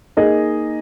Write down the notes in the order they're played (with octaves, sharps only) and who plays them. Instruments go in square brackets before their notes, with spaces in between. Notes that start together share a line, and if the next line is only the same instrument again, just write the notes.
[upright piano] A#3 D#4 G#4 D#5